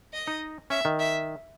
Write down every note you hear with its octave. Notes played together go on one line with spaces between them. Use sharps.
D#5
D#4
C#4 E5
D#3
E5